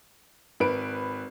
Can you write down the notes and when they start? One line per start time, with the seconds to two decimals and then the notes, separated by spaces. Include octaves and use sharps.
0.60 G#1 B4 D7